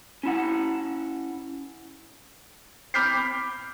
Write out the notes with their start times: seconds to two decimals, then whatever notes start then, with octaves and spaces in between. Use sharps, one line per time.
0.23 C#4 E4 F#5
2.94 B5 D6 F6 G6 B6 C7